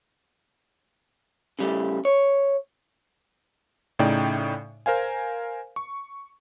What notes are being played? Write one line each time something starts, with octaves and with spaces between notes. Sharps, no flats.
C#3 G3 A3
C#5
A2 C#3 D#4 D5 G5
A#4 C5 F5 G#5
C#6